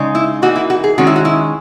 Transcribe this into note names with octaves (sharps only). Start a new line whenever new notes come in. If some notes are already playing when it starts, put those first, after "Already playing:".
Already playing: C#3 G#3 D#4
E4
E3 A#3 D#4 F#4
E4
F#4
G#4
D#3 G#3 C#4 F#4
E4
F#4
E4